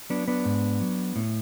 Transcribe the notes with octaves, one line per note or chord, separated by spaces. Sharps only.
F#3 B3 D4
B3 D4
G#2
F#3
A2